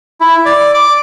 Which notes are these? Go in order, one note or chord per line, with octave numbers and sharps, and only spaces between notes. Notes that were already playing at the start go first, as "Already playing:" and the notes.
E4
D5
D6